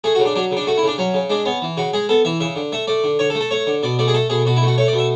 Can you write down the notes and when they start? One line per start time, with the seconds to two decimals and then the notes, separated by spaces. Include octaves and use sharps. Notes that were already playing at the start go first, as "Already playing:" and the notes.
0.04 A3 G#4
0.15 F#4
0.19 C#3
0.25 D4
0.35 F#3 D4
0.51 C#3
0.57 D4
0.67 A3 F#4
0.77 E4
0.83 C#3 D4
0.98 F#3 C#4
1.14 C#3
1.30 G#3 D4
1.45 B3 C#4
1.62 E3
1.77 C#3 F#4
1.93 G#3 G#4
2.09 B3 A4
2.25 E3 E5
2.40 C#3 E5
2.56 D3
2.72 A3 E5
2.87 A3 D5
3.04 D3
3.19 D3 C#5
3.30 A4
3.35 A3
3.41 A4
3.51 A3 C#5
3.67 D3
3.83 B2 D5
3.99 A3 D5
4.08 G#4
4.14 A3 A4
4.30 B2 G#4
4.45 B2 F#4
4.56 E4
4.62 A3 F#4
4.78 A3 C#5
4.88 D5
4.93 B2
4.98 E5